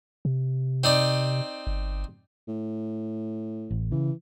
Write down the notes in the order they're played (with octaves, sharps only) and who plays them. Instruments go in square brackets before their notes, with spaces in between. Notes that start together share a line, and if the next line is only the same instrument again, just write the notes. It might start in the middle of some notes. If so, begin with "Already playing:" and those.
[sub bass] C3
[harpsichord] C4 D#4 D5
[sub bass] G1
[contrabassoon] A2
[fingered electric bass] A1
[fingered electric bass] C#3 [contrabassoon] E3